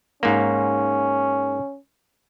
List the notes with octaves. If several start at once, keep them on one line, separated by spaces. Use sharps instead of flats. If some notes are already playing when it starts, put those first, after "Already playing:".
G#2 A#3 C#4